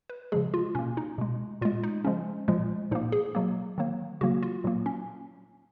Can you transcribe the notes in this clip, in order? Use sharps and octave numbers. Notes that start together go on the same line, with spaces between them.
B4
C#3 F3 G#3 G#4
F4
B2 A#3 C#4
D#4
B2 G#3
A#2 G#3 F4
D#4
C#3 F3 G#3 C#4
A#2 F3 G#3
A#2 F3 A#3 D#4
G#4
B2 F#3 A#3
D#3 F#3 A#3
C#3 F#3 A#3 F#4
F4
A#2 F#3 A#3
C#4